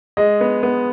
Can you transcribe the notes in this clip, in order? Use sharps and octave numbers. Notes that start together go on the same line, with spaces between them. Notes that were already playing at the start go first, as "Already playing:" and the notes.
G#3 D#5
B3
B3